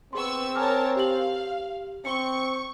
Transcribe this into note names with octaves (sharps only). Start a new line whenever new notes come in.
B3 C4 G#4 C6 C#6 E6
A#4 C#5 G#5 A5 D6 F6
G4 F5 F#7
C4 C#6 C#7 G7